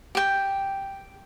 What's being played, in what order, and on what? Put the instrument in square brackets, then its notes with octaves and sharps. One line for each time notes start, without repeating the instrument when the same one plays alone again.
[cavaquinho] G4 G5